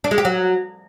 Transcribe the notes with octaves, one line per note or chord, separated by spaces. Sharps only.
D4
G#3
G4
F#3